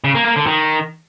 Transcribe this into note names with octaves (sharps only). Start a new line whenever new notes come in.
C#3
A#3
A#3
D3
D#3